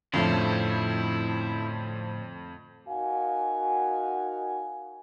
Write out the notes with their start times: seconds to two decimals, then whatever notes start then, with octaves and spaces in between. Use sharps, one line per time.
0.14 F2 A2 D3 F3 C#4 E4 E5 F5
2.88 D#4 F#4 A#4 F5 F#5 G#5